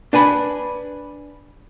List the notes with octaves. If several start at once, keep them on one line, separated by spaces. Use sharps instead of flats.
D4 B4 G#5 B5